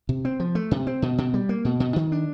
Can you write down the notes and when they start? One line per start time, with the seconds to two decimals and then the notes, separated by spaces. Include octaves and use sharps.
0.09 C3
0.25 C4
0.40 F3
0.55 A3
0.71 C3
0.87 C4
1.02 B2
1.18 B2
1.34 G3
1.49 A#3
1.65 B2
1.80 B2
1.96 D#3
2.12 D4